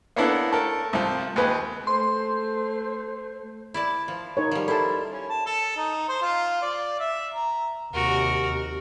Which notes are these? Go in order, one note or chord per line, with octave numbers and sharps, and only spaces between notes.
A#3 B3 C#4 D4 E4 A4
A3 A4 A#4
C2 F3
D#2 G#3 B4
A3 C5 C6
E4 D5 A5
F3
D#4 A#4 C#5
F3 G3
E4 A4 A#4 C5 A5
C#4
A5
A4
D#4
C5
F4
D5
E5
A#5
D#2 C3 F#4 A#4